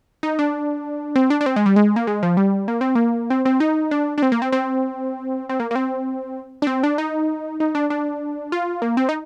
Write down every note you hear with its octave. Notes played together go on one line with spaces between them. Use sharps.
D#4
D4
C4
D4
D4
C4
G#3
G3
G#3
A#3
G#3
F3
G3
A#3
C4
A#3
C4
C4
D#4
D4
D4
C4
A#3
C4
C4
C4
A#3
A#3
C4
D4
C4
D4
D#4
D#4
D4
D4
F4
A#3
C4
D#4